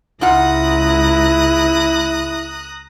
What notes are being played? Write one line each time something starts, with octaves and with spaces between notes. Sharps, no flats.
C#2 G#2 E4 F4 F#5 A#5 D#6 F#6